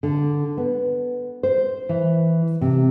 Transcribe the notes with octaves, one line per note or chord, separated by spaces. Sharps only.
D3
B3
C5
E3
C3